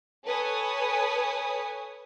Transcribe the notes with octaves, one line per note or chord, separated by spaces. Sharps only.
A4 B4 C#5 G#5 D#6